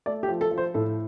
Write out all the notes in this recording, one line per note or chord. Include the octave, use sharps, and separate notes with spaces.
A3 D5
G4
F3
A4
F3
C5
A2 A4